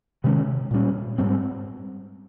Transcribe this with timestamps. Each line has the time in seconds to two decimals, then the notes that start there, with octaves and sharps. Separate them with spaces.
0.24 C3 D#3 G#3 C#4
0.71 A#2 G3 C#4
1.18 G#2 G3 C4